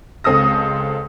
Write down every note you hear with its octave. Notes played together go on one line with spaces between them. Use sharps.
C#2 G#3 C4 A4 D#6 A#6